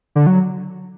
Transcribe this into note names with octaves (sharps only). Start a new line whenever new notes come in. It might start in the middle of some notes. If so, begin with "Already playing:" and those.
D3
F#3